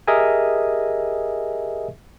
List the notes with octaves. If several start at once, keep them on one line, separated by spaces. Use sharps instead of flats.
G4 G#4 A#4 D#5 E5 G#5